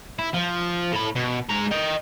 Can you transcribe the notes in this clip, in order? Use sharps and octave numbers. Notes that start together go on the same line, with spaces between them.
E4
F3
A2 B5
B2
G#3 A#5
D#5 G5